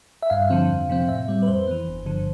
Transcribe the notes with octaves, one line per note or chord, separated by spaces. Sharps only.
E5
G2 F5
D3 F3 C4
F2
C3 F3 C4
A2 E5
G3 C4
B4
F2 C5
E3 B3
G1
G2 D3 F3